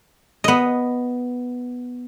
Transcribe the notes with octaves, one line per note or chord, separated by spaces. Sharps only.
B3 D#5